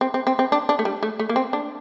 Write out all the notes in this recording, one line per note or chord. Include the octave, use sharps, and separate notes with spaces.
C4
C4
C4
C4
D4
D4
A3
G3
A3
A3
A#3
C4
D4